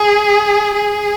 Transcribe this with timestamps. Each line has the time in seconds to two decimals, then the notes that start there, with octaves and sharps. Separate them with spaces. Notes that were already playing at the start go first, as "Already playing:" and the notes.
Already playing: G#4
0.74 G#4